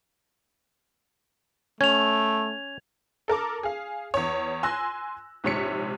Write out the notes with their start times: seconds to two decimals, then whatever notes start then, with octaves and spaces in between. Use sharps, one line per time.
1.81 A3 C#4 G#6 F7
3.28 A4 A#4 A5 D6
3.63 G#4 F5
4.14 E2 C#5
4.63 G#5 C6 E6 F#6 A#6
5.44 A#1 G#2 C3 C#5 B6 C#7